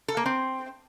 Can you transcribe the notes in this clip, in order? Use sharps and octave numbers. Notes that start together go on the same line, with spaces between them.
A4
A#3
C4